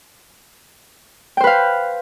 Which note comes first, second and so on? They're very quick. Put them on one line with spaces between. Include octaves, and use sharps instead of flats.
G5 C5 B4 F5